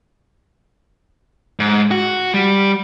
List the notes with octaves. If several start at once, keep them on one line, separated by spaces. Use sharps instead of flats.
G#2
F#4
G3